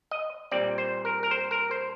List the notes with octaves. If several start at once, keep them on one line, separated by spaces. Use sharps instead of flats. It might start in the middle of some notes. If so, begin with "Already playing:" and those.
D#5
A#2 G3 C4 D5
C5
A#4
A#4
C5
A#4
C5